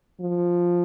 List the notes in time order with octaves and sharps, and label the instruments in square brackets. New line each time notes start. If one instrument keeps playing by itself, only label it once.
[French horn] F3